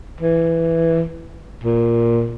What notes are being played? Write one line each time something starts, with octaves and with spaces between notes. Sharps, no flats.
E3
A#2